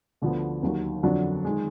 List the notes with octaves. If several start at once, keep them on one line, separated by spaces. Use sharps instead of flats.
D2 D3 F3 B3
D#2 D#3 F#3
F2 D3 F#3 D4
D#3 G#3